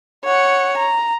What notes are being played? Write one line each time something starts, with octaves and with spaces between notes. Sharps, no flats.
C#5 F#5
A#5